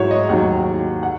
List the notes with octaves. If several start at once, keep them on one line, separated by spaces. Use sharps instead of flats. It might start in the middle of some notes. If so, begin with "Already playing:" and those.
Already playing: G#2 F#3 E4 F#4 C#5
D#5
D#2 D#3 F#3 F#5
F#5